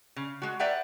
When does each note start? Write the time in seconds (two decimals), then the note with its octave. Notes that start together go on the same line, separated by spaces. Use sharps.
0.16 C#3
0.42 G#3 F#4
0.59 B4 D5 E5 F#5 G5 A#5